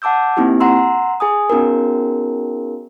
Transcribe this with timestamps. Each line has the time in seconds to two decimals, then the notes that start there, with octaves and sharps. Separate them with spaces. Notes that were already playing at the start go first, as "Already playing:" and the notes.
0.02 F#5 A5 D6 E6 G6
0.37 A#3 C4 D#4 E4 G4
0.60 F#5 A#5 C6 E6
1.20 G#4 G#5 D#6
1.50 B3 C#4 D#4 F#4 G#4 A#4